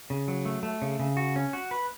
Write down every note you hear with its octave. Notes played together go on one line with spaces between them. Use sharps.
C#3
F#3
A3
A3
C#3
C#3
F#4
C#4
F#4
B4